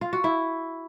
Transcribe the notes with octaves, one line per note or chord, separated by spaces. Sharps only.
F4
F#4
E4